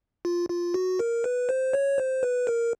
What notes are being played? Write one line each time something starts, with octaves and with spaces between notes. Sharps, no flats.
F4
F4
F#4
A#4
B4
C5
C#5
C5
B4
A#4